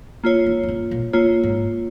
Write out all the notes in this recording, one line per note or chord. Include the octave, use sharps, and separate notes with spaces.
A#3 F4 C#5
D#3
D#3
C#3
A#2
C#3 A#3 F4 C#5
G#2